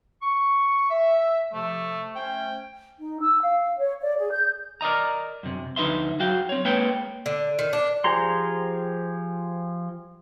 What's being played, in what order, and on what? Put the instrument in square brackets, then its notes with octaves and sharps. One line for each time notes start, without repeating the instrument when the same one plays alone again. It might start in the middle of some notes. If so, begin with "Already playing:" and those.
[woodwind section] C#6
E5
[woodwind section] C3 F3 [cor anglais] A3
[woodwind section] A3 C#4 C5 [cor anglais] G5
[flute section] D#4
E6
F5
C#5
D5
G#4
G6
[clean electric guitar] A#4 D5 D#5 A#5
F#2 C3
D2 F3 D#4 B4 E5 C6
F#3 F#4 F5 G5
C4 C#5
G#3 A#3 B4 C#5 G5
[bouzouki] D3
D#3
D4
[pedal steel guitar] F3 G4 G#4 A#5 C6